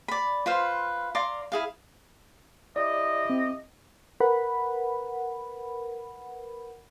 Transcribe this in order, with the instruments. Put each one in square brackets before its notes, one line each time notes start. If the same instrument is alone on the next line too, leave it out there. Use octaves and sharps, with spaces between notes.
[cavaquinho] D5 B5
F4 B4 C5 F5
D5 F5 A#5 C6
E4 G#4 F5
[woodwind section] E4 G4 D#5 [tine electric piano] D5
[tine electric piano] C4
[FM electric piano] A#4 B4 F#5 B5